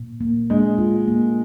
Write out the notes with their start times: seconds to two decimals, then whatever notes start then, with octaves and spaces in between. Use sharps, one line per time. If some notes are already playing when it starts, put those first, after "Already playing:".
Already playing: A#2
0.21 A#3
0.50 G#3 D4
0.78 F4
1.08 A#3